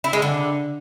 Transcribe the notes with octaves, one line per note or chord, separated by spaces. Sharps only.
E4
G#3
D3